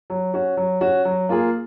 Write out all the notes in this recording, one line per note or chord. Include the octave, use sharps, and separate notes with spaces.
F#3
C#4 F#4
F#3
C#4 F#4
F#3
A#3 F4 G#4